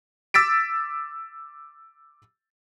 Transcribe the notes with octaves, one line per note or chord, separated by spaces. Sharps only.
D6 E6 A6 B6 D7